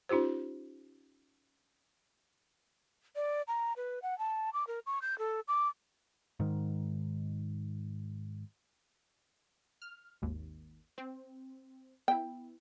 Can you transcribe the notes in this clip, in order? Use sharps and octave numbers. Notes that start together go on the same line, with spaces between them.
C#4 D#4 F4 G4 C5
D5
A#5
B4
F#5
A5
D6
A#4
C#6
G6
A4
D6
G#2 D#3
F6
G#1 D#2
C4
B3 E4 G5